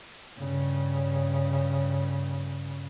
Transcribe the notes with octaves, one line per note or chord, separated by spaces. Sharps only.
G2 C#3